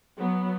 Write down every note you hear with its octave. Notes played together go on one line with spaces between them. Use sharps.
F#3 B3